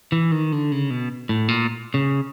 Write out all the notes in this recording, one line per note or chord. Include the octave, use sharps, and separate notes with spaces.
E3
D#3
D3
C#3
B2
A2
A#2
C#3